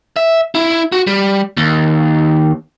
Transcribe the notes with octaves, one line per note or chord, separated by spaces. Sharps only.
E5
E4
F#4
G3
D#2